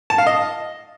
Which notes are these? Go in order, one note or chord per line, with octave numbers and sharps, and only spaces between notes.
A5
F5
D#5